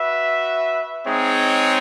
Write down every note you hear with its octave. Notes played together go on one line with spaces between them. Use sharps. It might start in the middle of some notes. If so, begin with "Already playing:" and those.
Already playing: F#4 B4 E5
G#3 C4 D#4 G#4 C#5